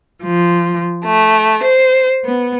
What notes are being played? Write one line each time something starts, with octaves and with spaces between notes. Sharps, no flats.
F3
A3
C5
B3